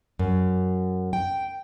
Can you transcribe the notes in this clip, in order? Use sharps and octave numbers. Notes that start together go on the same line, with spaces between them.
F#2
G5